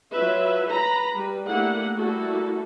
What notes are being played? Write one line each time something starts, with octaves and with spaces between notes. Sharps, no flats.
F#3 F4 B4 E5
B4 A#5 B5
G3 B4
A3 A#3 D4 E4 G4 F#5
G3 A3 A#3 E4 F#4 A4